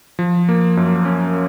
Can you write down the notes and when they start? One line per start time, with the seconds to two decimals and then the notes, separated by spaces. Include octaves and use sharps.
0.19 F3
0.49 A#3
0.77 F#2
1.05 C#4